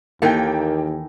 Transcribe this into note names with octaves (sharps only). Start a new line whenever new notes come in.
D#2 D#3 E3 A#3 A4 G5